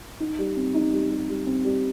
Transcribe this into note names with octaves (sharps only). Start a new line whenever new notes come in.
D#4
G3
C4
D#4
G3
G3
G3
C4
G3